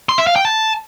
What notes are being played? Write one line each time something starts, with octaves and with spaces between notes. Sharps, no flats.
C6
E5
F5
G5
A5